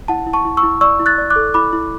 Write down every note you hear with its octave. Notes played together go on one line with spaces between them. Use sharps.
E4 F#5 A5
E4
A5 C#6
E4
C#6 E6
E4
D5 C#6 E6
E4
F#6 A6
D5
D6 F#6
A4
E4 B5 D6
E4